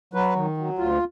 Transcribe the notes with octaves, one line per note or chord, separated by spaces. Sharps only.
F#3 B4
D#3
F#3
D2 F4